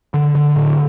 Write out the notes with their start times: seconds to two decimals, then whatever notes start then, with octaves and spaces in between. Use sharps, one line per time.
0.14 D3
0.35 D3
0.56 A2